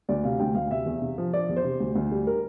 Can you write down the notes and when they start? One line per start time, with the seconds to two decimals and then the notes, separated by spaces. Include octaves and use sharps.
0.09 D2 D5
0.24 C3 F5
0.40 D2 G5
0.55 D2 F5
0.71 C3 E5
0.86 E2
1.02 C3
1.18 F3
1.33 F3 D5
1.49 E2
1.56 C5
1.64 C3
1.80 D2
1.96 D2
2.12 G3
2.27 A#4